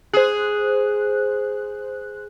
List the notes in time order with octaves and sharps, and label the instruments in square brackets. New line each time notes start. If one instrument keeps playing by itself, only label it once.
[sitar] G#4 [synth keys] C5 F#6